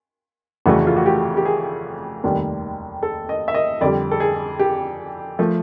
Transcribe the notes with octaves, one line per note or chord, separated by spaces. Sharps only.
F1 F2 C#3 E3 A3 F#4
F4
F#4
G4
G4
G#4
F1 D#2 D#3 G3
A4
D#5
E5
D#5
F2 D3 G3 D5
A4
G#4
G4
F3 A3